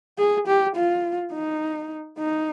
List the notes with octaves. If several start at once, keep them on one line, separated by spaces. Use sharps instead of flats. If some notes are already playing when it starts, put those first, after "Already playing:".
G#4
G4
F4
D#4
D#4